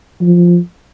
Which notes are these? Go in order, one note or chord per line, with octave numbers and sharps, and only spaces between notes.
F3